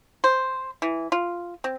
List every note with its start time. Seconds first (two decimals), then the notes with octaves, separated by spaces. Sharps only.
0.24 C5
0.82 E3
1.12 F4
1.64 C4